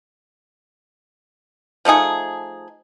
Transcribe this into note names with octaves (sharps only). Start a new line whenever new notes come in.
F3 A3 D#4 G#4